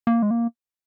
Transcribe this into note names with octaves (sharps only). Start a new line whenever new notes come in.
A#3
G#3
A#3